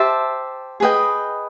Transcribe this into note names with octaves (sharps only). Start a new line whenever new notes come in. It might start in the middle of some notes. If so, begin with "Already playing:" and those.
Already playing: G4 C5 E5 A5
G#4 B4 D#5 G5